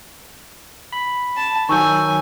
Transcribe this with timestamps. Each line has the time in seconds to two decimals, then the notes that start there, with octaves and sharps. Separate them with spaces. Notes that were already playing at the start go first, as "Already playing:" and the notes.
0.93 B5
1.37 A5
1.69 D#3 F#3 G#5 C#6 E6 G6